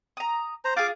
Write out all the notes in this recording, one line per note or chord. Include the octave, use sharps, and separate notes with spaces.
A#5 D#6
C5 A#5
F4 G#4 F5 D6